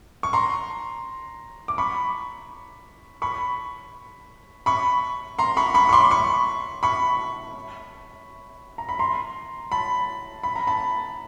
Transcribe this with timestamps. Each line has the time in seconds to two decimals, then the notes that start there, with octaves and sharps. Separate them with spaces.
0.23 C#6
0.33 A#5 C6
1.68 D6
1.78 B5 C#6
3.22 B5 C#6
4.66 B5 C#6
5.39 A#5 C6
5.57 B5 C#6
5.74 B5 C#6
5.89 C#6
5.93 C6 D6
6.11 B5 C#6
6.83 B5 C#6
8.78 A#5
8.89 B5
8.99 A#5 C6
9.72 A5 B5
10.43 B5
10.56 A#5
10.67 A5 B5